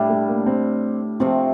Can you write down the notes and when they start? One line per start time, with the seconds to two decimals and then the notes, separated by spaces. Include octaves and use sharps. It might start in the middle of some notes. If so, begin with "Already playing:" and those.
Already playing: A2 G3 D4
0.09 A3
0.28 A#3
0.46 C4
1.20 C3 F3 A3 C4